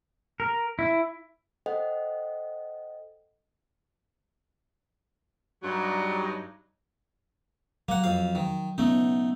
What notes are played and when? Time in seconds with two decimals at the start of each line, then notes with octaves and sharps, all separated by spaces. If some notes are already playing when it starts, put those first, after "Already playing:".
0.40 A#4
0.79 E4
1.66 A4 C5 D#5 F#5 G5
5.63 G2 F#3 D#4
7.88 F#3 A#3 F#5
8.04 F2 F5
8.35 D#3
8.78 A3 B3 C#4 D#4